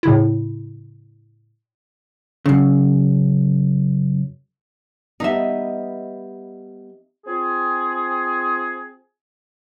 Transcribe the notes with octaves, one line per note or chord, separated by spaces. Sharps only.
A2 C#3 E4
F#2 C#3
G3 B3 D#4 D#5 E5
C4 F4 G#4